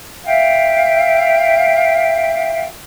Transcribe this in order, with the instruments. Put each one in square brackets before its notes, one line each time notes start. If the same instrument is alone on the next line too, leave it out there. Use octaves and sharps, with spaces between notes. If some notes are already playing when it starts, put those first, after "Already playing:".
[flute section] E5 F5 G5